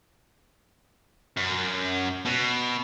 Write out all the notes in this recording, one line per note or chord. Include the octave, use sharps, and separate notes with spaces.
F#2
B2